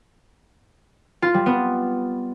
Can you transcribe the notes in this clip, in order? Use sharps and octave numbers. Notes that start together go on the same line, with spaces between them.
F4
G3
B3